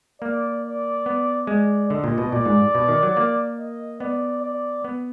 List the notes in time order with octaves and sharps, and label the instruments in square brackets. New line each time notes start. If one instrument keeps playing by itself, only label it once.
[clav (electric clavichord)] A#3 [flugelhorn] D5
[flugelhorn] D5
[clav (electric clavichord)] B3
[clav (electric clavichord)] G#3 [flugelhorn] D5
[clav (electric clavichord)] D3 [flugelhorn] D#5
[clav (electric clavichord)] A#2
B2
[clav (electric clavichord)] A#2 [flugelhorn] D5
[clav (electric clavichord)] G#2
B2
D#3
F#3
A#3
[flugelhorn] D#5
[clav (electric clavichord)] B3 [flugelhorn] D5
[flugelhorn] D5
[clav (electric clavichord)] B3